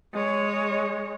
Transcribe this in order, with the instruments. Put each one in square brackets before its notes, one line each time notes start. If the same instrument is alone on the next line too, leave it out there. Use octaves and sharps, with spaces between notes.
[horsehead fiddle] G#3 C#5